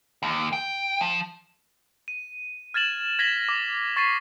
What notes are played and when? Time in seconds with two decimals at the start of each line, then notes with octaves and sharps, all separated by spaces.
0.23 D#2
0.53 G5
1.01 F3
2.08 D#7
2.74 F6 G#6 A6 E7 F#7
3.19 G#6 A#6 B6 E7 F#7 G7
3.49 D6
3.96 C#6 A6 B6 C7 D#7